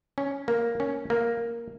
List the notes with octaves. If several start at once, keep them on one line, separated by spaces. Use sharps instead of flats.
C#4
A#3
C#4
A#3